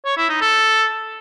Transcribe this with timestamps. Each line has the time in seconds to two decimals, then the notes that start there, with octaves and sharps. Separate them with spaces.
0.05 C#5
0.17 E4
0.29 D#4
0.41 A4